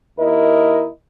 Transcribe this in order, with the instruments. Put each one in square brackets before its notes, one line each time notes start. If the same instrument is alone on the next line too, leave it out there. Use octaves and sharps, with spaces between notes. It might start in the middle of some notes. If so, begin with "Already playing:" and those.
[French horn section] D#2 E4 A#4 D#5